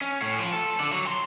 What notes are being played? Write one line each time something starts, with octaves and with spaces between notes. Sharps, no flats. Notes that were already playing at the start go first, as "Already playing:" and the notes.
C#4
A2
F3
A4
D3
F#3
C6